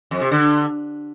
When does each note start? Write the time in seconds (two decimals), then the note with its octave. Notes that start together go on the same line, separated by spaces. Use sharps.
0.11 F2
0.21 C3
0.31 D3